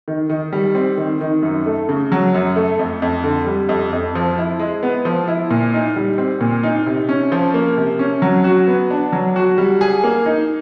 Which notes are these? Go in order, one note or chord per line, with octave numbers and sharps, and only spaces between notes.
D#3
D#3
G3
C4
D#3
D#3
F#2
A3
C#3
F#3
F#2
A3
F2
F2
D3
G3
F2
F2
F3
E4
G#3
B3
F3
E4
A#2
D#4
G3
C4
A#2
D#4
C3
C#4
F3
A#3
C3
C#4
F#3
F#4
B3
D4
F#3
F#4
G3
G#4
A#3
D#4